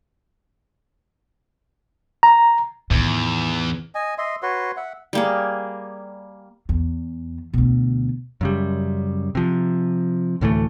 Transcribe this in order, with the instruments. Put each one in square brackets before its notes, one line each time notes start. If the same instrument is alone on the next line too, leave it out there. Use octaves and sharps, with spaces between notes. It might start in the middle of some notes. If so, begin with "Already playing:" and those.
[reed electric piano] A#5
[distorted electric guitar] E2 [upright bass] A2 D#3
[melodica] D#5 G#5
D#5 E5 C6
F#4 B4 C#5 C6
E5 F#5
[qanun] G3 A#3 G#4
[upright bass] E2
D2 B2
[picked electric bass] F#2 C#3 G3
C3 F3
D2 A2 E3 A3